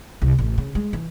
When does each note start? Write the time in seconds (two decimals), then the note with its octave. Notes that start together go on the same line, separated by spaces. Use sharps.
0.22 C2
0.38 A1
0.58 C#3
0.75 G#3
0.93 E3